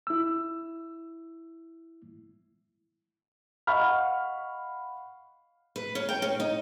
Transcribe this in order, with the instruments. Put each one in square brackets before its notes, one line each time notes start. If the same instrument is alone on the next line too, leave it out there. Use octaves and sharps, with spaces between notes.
[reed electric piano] E4 E6
[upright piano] D#5 F5 F#5 B5 C#6 F6
[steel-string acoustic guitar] B4
C#4
G5
C#4
D#4